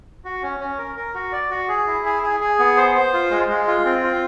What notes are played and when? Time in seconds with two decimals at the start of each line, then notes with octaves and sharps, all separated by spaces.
0.25 F#4
0.42 C#4
0.60 C#4
0.78 A#4
0.97 A#4
1.14 F#4
1.32 D5
1.51 F#4
1.68 G#4
1.87 E4
2.05 G#4
2.23 G#4
2.40 G#4
2.59 B3
2.77 C5
2.95 C5
3.13 F4
3.31 G#3
3.49 G#3
3.67 F4
3.85 C4
4.03 F4